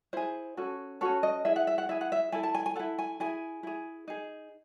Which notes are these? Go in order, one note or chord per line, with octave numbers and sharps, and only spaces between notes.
E4 G#4 C5
C#4 F#4 A4
C#4 F#4 A4 C#5
D#5
E4 G#4 E5
F#5
E5
F#5
E4 G#4 E5
F#5
E5
E4 A4 G#5
A5
G#5
G#5
E4 A4 F#5
G#5
E4 G#4 G#5
E4 G#4
D#4 G#4